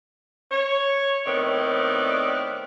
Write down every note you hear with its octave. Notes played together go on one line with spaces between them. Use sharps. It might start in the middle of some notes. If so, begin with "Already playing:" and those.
C#5
A2 D#3 B3 C4 D5